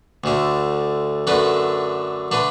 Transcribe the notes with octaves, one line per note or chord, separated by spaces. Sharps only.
D2 D3 A3
F#2 D3 A3 D4 B4
D3 A3 D4 B4